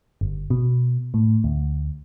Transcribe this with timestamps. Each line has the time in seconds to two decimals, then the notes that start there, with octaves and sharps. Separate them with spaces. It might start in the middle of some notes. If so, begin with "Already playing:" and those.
0.21 G1
0.50 B2
1.14 A2
1.44 D2